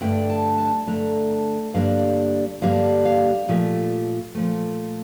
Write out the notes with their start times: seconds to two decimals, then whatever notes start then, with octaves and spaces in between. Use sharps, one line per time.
0.01 G2 D3 A3 D4 G5
0.30 A5
0.58 A5
0.87 G2 D3 A3 D4 A#5
1.31 A5
1.74 G2 D3 G3 A#3 D4 F5
2.61 G2 D3 G3 A#3 D4 F5
3.05 F5
3.48 A#2 F3 A3
4.35 A#2 F3 A3